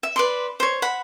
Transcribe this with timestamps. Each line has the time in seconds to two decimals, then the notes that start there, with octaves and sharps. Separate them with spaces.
0.03 E5
0.16 B4 D5 C6
0.60 C5 C#5
0.82 F#5 B5